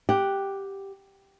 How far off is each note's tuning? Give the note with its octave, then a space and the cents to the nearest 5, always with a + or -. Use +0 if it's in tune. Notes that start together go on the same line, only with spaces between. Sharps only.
G4 +0 F#5 +0